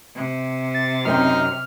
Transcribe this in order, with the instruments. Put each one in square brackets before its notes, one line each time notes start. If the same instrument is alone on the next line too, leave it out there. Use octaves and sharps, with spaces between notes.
[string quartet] C3
[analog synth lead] A6
[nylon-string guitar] F#2 C4 G5 [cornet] D#4 [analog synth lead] F6